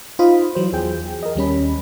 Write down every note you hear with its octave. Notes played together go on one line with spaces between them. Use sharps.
D#4 F4 C5 F5 B5 D#6
E3 F#3 C5
E2 G#4 G5 G6
A#4 D#5
D#2 G3 C#4 B5